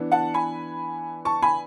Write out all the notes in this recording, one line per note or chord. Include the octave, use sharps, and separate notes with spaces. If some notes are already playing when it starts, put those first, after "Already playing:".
Already playing: E3 B3 D4
F#5 A5
G#5 B5
A5 C#6
G#5 B5